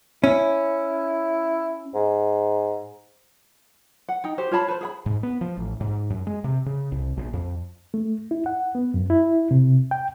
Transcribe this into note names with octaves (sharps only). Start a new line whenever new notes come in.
C#4 E4
G#2
F#5
D#4 G5
F#4 G4 C5
F4 C#5 A5 B5
B4 C5
G#4 F#5 B5
G#2
B3
F3
A1
G#2
F#2
G#3
C3
C#3
C2
A#1
F2
A3
E4
F#5
B3
F#2
E4
C3
G5